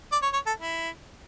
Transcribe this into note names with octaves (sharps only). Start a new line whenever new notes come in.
D5
C#5
C#5
A4
E4